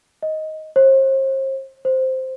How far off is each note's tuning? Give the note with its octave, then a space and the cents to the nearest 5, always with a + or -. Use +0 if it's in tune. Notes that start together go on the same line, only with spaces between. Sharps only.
D#5 +10
C5 +40
C5 +0